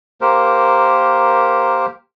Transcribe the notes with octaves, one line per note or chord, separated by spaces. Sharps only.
A#3 G4 A#4 C5